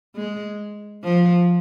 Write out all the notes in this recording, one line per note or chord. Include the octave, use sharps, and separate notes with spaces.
G#3
F3